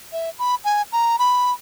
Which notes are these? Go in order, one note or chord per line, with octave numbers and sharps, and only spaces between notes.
E5
B5
G#5
A#5
B5